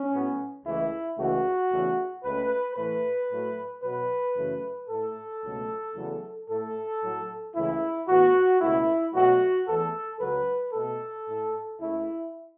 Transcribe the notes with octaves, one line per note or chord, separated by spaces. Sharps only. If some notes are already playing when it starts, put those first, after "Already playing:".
Already playing: C#4
A2 F#3 B3
C#2 C#3 E3 A3 E4
C#2 C#3 E3 A3 F#4
E2 C#3 A3
C#2 C#3 A3 B4
A2 E3 A3 B4
A2 F#3 A3
B2 F#3 B3 B4
F#2 C#3 E3 A3
A2 A3 A4
C#2 B2 F#3 A3
E2 C#3 F#3 A3
A2 A3 A4
A2 F#3 A3
C#2 C#3 E3 A3 E4
A2 E3 B3 F#4
C#2 B2 A3 E4
B2 F#3 A3 F#4
E2 E3 A3 A4
C#2 C#3 F#3 B4
B2 A3 A4
A2 A3
C#2 C#3 A3 E4